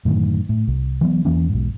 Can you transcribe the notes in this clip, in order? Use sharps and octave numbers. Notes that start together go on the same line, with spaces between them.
F#2 A2 D3 D#3
A2
C2
E3 F#3 B3
E2 E3 A#3 C#4
B1 G#2